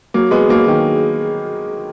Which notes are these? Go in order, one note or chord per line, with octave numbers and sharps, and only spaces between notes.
F#3 A#3
G#3 B3
F#3 A#3
D#3 F#3